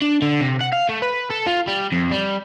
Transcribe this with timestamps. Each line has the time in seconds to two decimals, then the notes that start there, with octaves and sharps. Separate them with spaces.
0.02 D4
0.22 D3
0.41 C3
0.61 F#5
0.73 F5
0.89 A3
1.02 B4
1.30 A4
1.47 F4
1.68 G3
1.92 F2
2.12 G3